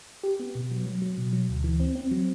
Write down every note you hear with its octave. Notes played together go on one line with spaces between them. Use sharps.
G4
B3
B2
F#3
F#3
F#3
B2
F#3
D2
E3
C4
C4
F#3